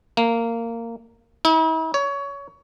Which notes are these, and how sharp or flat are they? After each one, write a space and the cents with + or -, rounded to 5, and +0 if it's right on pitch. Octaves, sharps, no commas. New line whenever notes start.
A#3 -15
E4 -45
C#5 +20